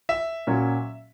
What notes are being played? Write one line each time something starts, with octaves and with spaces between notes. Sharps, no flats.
E5
A#2 F#3 C#4